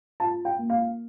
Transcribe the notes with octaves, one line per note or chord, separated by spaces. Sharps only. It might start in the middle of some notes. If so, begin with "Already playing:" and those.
F4 A5
G5
A#3
F5